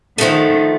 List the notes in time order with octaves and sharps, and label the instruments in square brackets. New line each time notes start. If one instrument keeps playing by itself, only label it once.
[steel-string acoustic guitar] D3 F3 A3 [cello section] D#3